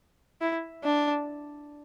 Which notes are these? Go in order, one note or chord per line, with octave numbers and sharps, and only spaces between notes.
E4
D4